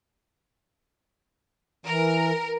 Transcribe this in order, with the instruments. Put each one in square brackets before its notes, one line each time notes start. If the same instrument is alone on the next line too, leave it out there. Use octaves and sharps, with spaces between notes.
[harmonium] E3 [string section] A#4